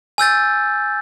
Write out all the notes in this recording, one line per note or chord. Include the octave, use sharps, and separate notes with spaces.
G#5 E6 G6 A6